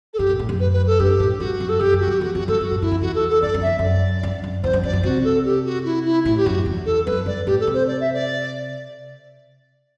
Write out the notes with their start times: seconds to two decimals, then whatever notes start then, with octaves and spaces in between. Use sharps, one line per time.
0.13 A4
0.18 G2 G4
0.29 B2
0.39 A2
0.49 F#2
0.60 B4
0.72 B4
0.87 A4
1.00 G2 G4
1.20 A2
1.40 G2 F#4
1.60 F#2
1.69 A4
1.80 F#2 G4
1.93 G2
2.00 F#4
2.08 F#2
2.14 G4
2.21 E2 F#4
2.35 F#2 F#4
2.48 G2 A4
2.61 F#2 F#4
2.72 A2
2.82 G2 E4
2.91 F#2
3.01 E2 F#4
3.15 A4
3.29 A4
3.42 G2 D5
3.54 F#2
3.62 E5
3.67 E2
3.79 F#2 D5
4.23 G2
4.44 F#2
4.63 E2 C5
4.73 F#2
4.83 F#2 D5
4.93 G2
5.03 C3 F#4
5.24 A4
5.45 G4
5.65 F#4
5.85 E4
6.05 E4
6.25 A2 E4
6.37 G4
6.46 F#2 F#4
6.66 E2
6.86 A4
7.06 F#2 B4
7.26 G2 D5
7.46 A2 G4
7.60 A4
7.67 C3
7.74 C5
7.87 D5
8.00 E5
8.14 D5